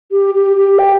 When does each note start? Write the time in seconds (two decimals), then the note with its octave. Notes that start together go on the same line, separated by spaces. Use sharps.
0.12 G4
0.35 G4
0.56 G4
0.79 G5